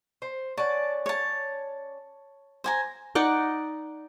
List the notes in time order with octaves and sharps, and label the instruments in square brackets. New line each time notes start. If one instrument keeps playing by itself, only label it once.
[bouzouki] C5
[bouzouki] C#4 D5 F#5 [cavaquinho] A5
[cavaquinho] C#5 A5
C5 G#5 A#5
[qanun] D#4 D5 F#5